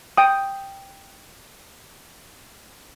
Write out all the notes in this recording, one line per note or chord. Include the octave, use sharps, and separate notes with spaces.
G5 D#6